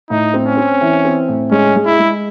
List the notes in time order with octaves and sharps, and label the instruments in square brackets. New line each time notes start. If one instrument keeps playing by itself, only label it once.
[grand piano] A2 [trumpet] D#4
[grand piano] C4
[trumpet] C#4
[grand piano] C4
E3
C4
A2
[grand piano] G#3 [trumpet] C#4
[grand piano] G#3
[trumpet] E4
[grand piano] G#3